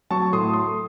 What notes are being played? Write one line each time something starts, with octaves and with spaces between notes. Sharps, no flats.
F#3 A5 C#6
A2 C6 D#6
A3 C6 D#6